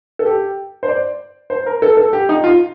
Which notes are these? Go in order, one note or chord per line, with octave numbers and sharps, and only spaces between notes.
A4
G4
C5
D5
C5
A#4
A4
A4
G4
D#4
F4